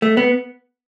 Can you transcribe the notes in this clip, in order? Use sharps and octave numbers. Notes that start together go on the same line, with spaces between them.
A3
B3